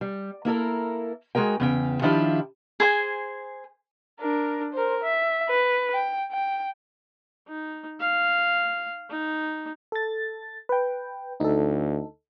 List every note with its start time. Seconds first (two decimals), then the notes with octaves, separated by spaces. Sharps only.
0.01 G3
0.45 A#3 E4 A4 A#4
1.35 G#3 F#4 G#4 A#4 G5
1.60 E2 C#3 G5
2.02 D#3 F3 D4 E4 F4 G4
2.80 G#4 C5 G#5
4.20 D4 A#4
4.73 A#4 C5
5.03 E5
5.49 B4
5.94 G5
6.32 G5
7.48 D#4
8.00 F5
9.10 D#4
9.92 A4 A6
10.69 B4 G5
11.40 D2 D#4 A4